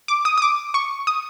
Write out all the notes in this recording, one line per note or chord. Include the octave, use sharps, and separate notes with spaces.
D6
D#6
D#6
D6
C#6
D#6